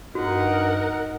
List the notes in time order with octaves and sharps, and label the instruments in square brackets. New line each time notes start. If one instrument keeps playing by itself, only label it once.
[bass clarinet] G2 [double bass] D#4 [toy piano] F#4 [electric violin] A#4 F#5